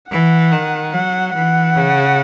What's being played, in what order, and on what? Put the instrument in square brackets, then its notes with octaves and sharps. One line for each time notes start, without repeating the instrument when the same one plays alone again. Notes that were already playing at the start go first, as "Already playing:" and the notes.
[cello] E3 [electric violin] F#5
[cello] D#3
[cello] F#3 [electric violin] F#5
[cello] E3 [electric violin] F#5
[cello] C#3